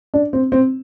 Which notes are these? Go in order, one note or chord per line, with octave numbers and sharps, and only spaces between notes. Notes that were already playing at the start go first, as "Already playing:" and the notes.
D4
C4
C4